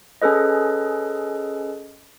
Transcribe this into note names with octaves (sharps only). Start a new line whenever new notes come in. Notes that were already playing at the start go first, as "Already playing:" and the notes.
C#4 G#4 A4 B4 D#5